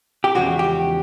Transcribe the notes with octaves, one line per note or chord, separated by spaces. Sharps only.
G4
E2 C#3 F3 G#3 F#4
G4